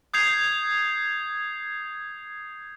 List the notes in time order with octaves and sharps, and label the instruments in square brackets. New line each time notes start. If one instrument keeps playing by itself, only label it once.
[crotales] D#6 G6 G#6 C7 F7